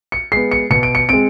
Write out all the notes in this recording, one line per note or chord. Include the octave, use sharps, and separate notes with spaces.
C#7
G#3 B3 C7
C#7
B2 C#7
D7
C#7
G#3 C4 D7